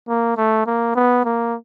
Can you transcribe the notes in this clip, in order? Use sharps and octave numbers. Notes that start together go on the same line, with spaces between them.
A#3
A3
A#3
B3
A#3